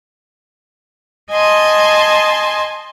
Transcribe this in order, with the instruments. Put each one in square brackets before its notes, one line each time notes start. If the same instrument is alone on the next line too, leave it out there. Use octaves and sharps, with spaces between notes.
[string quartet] D#5 G#5 A5 C6